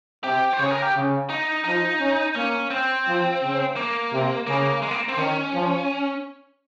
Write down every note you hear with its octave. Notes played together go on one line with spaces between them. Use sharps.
C3 G4
C5
C#3 C#5
G#4
A#4
G4
C#3
D#4
F3 D#4
C#4
A#3 C#4
C4
F3
C#3
A#3
C3
C#3 A#3
G#3
A#3
C4
D#3 C#4
F3